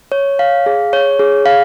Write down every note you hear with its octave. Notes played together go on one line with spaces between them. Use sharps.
C#5
F5
G#4
C#5
G#4
F5